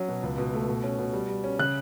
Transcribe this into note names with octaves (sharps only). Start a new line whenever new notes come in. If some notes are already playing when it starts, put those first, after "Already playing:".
Already playing: F#3 C#4
B2
C#2
B2
A3
B2
C#4
B2
G3
G3
C#4
C#3 F#6